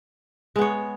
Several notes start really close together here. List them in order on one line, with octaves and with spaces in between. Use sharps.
G#3 B3 C#5